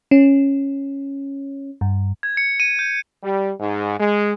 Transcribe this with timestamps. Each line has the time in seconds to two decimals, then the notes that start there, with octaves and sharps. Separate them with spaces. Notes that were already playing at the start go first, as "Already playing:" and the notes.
0.11 C#4
1.81 G2
2.23 G#6
2.37 C#7
2.60 D#7
2.79 G6
3.23 G3
3.59 G#2
3.98 G#3